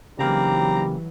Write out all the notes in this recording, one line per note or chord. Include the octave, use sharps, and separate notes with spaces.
C#3 E3 F#3 G3 A#3 C4 D#4 A#5